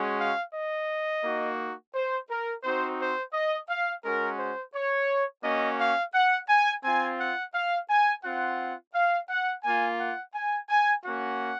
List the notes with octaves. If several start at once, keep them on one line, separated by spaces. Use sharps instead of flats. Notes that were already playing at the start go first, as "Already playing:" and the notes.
Already playing: G#3 C#4 F#4
F5
D#5
A#3 D#4 F#4
C5
A#4
C4 D#4 F#4 C5
C5
D#5
F5
G#3 C#4 F#4 A#4
C5
C#5
A#3 C#4 F#4 D#5
F5
F#5
G#5
C4 F4 G#5
F#5
F5
G#5
C4 F4 F#5
F5
F#5
A#3 F4 G#5
F#5
G#5
G#5
A#3 C#4 F#4 F#5